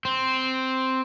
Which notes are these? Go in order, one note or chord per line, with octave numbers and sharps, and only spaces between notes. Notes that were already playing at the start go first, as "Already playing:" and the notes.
C4